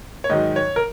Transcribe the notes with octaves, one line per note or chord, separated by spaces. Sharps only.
C#5
G#2 D#3 F#3 D#5
C#5
A#4